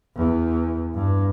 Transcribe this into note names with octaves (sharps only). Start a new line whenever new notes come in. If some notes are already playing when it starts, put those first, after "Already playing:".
E2
G2